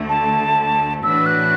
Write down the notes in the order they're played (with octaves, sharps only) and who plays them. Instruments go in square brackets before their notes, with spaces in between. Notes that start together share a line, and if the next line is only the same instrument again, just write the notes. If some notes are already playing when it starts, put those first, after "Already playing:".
Already playing: [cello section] D2 D3 A3
[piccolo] A5
[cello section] A2 E3 D4 F#4 B4 [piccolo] E6
[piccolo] F#6